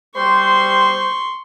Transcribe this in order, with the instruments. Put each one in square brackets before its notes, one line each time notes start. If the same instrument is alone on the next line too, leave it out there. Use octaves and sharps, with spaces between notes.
[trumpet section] G3 C5 [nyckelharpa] C6 C#6